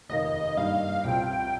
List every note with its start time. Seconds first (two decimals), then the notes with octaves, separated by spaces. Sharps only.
0.09 F1 D#2 D#3 A#3 D#5
0.57 G2 G3 A#3 D#4 F5
1.04 C2 C3 F3 G5